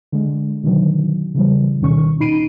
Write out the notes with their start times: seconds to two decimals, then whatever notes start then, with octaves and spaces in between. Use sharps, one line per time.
0.12 D3 G#3
0.63 B2 D3 D#3 F#3
1.35 C#3 E3 G3
1.81 D2 B2 D#3 C#4 C#6
2.20 A#2 D#4 B5 C7 D7 D#7